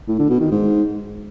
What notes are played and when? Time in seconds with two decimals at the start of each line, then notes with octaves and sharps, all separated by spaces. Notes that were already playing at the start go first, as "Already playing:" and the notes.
0.08 A2
0.19 D3
0.30 B2
0.40 D#3
0.51 G#2